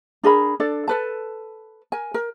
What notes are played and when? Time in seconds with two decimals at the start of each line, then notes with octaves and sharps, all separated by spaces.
0.24 D4 G#4 A#4 B5
0.60 D4 A4 D5
0.88 A4 B4 A5
1.92 A#4 G#5
2.14 A#4